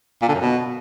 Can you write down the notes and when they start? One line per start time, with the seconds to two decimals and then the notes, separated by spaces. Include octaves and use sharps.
0.22 A#2
0.29 D3
0.35 F#2
0.41 B2